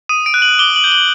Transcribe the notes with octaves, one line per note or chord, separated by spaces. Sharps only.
D#6 D#7
D7
F#6
F#7
D6 G7
F#7
G6
F#7